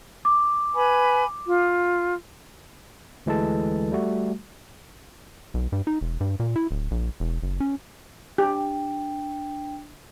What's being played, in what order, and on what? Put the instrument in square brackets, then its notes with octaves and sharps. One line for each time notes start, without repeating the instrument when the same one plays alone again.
[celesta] D6
[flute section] B4 G#5 B5
F4
[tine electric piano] D2 E3 G#3 A4 A5
G3 A3 F#4
[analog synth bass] B1
G2
D#4
E1
G2
A#2
E4
D1
A#1
E1
F#1
C#4
[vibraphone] D4 G5 [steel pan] G4